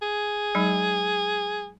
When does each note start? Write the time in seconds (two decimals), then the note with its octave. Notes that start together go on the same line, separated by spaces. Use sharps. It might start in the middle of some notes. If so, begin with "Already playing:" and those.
0.02 G#4
0.55 F#3 G#3 D#4